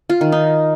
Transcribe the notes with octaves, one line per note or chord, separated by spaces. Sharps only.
F4
D#3
D#4